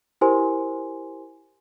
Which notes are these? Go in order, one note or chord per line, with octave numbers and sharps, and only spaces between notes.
E4 G4 A#4 C5 G#5 C6